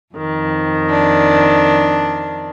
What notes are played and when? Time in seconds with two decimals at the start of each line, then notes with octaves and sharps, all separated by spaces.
0.14 F2 D#3
0.88 D4